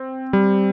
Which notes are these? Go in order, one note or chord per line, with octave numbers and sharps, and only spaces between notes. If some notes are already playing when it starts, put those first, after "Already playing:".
Already playing: C4
G3